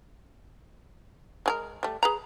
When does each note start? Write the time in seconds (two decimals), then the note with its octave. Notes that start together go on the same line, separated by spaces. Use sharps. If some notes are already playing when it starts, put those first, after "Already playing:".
1.46 G#3 G#4 A#4
1.83 G3 A3
2.03 G#4 B4 A#5